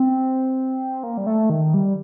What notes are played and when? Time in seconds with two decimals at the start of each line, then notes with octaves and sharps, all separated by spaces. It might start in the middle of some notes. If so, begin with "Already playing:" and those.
Already playing: C4
1.03 A#3
1.17 G3
1.27 A3
1.50 D#3
1.74 G3